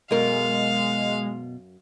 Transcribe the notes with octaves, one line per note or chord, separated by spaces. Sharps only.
F#2 B2 G#3 A#4 F5